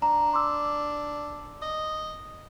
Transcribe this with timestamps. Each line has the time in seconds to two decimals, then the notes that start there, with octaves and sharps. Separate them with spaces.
0.02 D4 A#5
0.33 C6 D6 E6
1.62 D#5